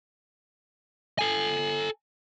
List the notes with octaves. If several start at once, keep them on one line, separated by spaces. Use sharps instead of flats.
A4 G#5